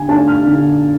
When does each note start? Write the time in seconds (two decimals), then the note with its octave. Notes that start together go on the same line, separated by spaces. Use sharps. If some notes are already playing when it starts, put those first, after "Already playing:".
Already playing: D3 G#5
0.09 A3 D4 A5
0.28 F6
0.46 D3